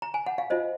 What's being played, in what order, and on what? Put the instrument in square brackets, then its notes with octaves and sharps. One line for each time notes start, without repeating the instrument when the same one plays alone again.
[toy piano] A#5
G#5
F#5
F5
F4 C5 D#5